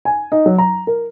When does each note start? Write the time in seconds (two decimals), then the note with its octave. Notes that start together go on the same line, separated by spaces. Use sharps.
0.05 G#5
0.32 D#4
0.46 F#3
0.58 A#5
0.87 A#4